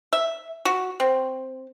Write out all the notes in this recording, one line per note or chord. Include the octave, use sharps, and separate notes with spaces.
E5
F#4
C4